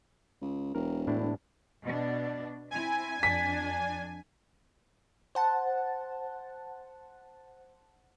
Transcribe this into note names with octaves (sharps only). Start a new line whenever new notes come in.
C#2
E1 A#4
A2 D4 E4
B2 D4
C4 E4 G#5
F2 D4 B6
C5 F#5 A5